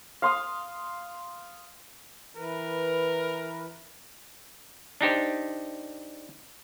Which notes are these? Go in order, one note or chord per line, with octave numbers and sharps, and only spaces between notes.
F5 C6 D#6
E3 A#4 B4
D4 D#4 G4 C5